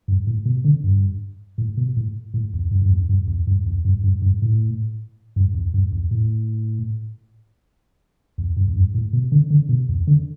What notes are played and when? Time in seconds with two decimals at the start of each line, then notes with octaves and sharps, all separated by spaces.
0.08 G2
0.27 A2
0.46 B2
0.64 D3
0.84 G2
1.58 A2
1.77 B2
1.97 A2
2.34 A2
2.53 E2
2.71 G2
2.82 G2
2.90 E2
3.09 G2
3.28 E2
3.47 G2
3.66 E2
3.85 G2
4.04 G2
4.22 G2
4.42 A2
5.36 G2
5.55 E2
5.74 G2
5.92 E2
6.11 A2
8.38 E2
8.57 G2
8.68 E2
8.76 G2
8.94 A2
9.13 B2
9.32 D3
9.50 D3
9.69 B2
9.89 E2
10.07 D3